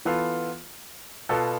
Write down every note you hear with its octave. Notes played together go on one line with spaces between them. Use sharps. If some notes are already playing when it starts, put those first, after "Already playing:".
E3 B3 F4 A4
B2 B3 F4 A4